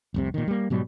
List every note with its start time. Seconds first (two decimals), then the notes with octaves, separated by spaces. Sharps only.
0.14 F1 C2 C3
0.34 A#2 D#3
0.47 G3 A#3
0.70 G#2 B2 F#3 G3